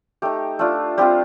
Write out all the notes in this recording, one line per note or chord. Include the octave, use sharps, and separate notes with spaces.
A3 D#4 G4
A3 D4 F4
G3 C4 F4 G4